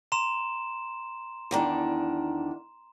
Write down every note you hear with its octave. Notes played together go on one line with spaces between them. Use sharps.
A#5 C6 E7
E2 D#3 D4